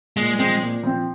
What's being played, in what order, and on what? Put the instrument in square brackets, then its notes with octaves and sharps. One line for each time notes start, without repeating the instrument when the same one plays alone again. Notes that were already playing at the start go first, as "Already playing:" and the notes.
[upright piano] A#2 [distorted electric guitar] G#3
[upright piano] F3 C4 [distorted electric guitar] G#3
[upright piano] A#2
F3 C4